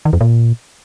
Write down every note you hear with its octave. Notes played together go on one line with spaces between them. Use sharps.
D#3
F2
A#2